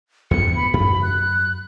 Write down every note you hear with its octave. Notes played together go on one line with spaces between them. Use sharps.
E2 G2 B3 C#7
B5
F#2 B5
F#6